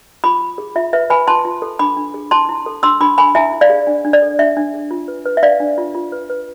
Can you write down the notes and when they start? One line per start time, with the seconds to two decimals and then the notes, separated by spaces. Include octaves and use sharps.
0.24 F4 B5 D6
0.41 F4
0.58 G#4
0.76 F4 E5
0.93 B4 E5
1.10 B4 G#5 B5
1.27 F4 A5 C6
1.45 F4
1.62 A4
1.79 D4 B5 D6
1.97 D4
2.14 G#4
2.31 E4 A5 C6
2.49 E4
2.66 A4
2.83 D4 C6 E6
3.00 D4 B5 D6
3.18 A4 G#5 B5
3.35 E4 E5 G#5
3.53 E4
3.61 D5 F5
3.70 G#4
3.87 D4
4.05 D4
4.13 D5
4.22 A4
4.39 D4 E5
4.57 D4
4.74 G#4
4.91 F4
5.08 B4
5.25 B4
5.37 E5
5.43 D4 D5 F5
5.60 D4
5.78 F4
5.95 F4
6.12 B4
6.30 B4